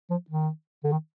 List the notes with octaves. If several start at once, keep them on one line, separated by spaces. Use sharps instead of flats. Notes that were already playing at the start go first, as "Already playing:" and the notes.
F3
D#3
D3
D#3